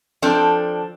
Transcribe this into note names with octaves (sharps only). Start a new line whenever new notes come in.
F3 C4 D4 A4